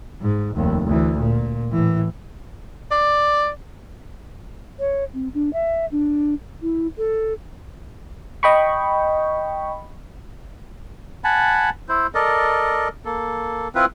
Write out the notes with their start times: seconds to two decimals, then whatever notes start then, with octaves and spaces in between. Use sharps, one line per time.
0.21 G#2
0.55 F1 D#2
0.86 D2 E3
1.18 A#2
1.72 A2 E3
2.91 D5
4.78 C#5
5.14 C4
5.34 D4
5.53 E5
5.91 D4
6.62 E4
6.98 A4
8.43 D#5 G5 B5 C#6
11.24 F#5 G#5 A5 B5
11.89 E4 C5
12.15 A4 A#4 D5 D#5
13.05 A#3 A4
13.75 C4 E4 F4 B4